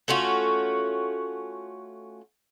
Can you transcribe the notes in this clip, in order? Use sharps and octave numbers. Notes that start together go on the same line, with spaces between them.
A3 C#4 F4 F#4